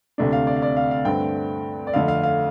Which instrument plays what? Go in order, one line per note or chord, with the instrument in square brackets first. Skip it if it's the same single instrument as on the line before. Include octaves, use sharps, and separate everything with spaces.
[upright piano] D2 C3 A3 D4
F5
D5
F5
D5
F5
F5
G2 D3 A3 C4 G5
D5
F2 D3 A3 F5
F5
F5